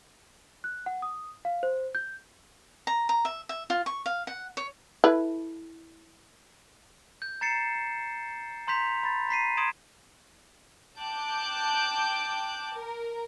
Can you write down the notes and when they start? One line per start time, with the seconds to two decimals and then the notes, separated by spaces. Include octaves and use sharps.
0.64 F#6
0.86 F#5
1.02 D#6
1.45 F5
1.63 C5
1.95 G6
2.87 A#5
3.09 A#5
3.25 E5
3.49 E5
3.70 F4
3.86 C#6
4.06 F5
4.27 F#5
4.57 C#5
5.04 E4 A4 B4
7.22 G6
7.41 A#5 A6 C7 C#7 E7
8.67 A#5 C6 G6 B6 F7
9.03 B5 A6
9.29 A#5 B6 C7 D#7
9.57 C6 D#6 G#6 D7 E7
10.99 G5 A5 D6 F#6 G6
12.75 A#4